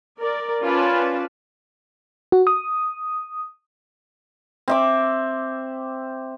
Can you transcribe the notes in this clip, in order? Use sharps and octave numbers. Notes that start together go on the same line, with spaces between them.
A#4 D5
C#4 F4 B4 D5 A5
F#4
D#6
C4 E5 D6